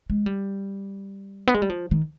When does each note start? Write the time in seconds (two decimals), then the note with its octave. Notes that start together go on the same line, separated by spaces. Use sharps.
0.10 G#3
0.26 G3
1.47 B3
1.54 G#3
1.62 G3
1.70 F3
1.91 D#3